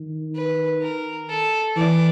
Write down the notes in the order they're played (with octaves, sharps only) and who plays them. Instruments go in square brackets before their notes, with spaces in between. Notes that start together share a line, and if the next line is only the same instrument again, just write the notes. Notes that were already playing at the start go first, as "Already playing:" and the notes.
Already playing: [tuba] D#3
[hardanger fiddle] B4
A#4
A4
[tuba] E3 [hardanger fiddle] D5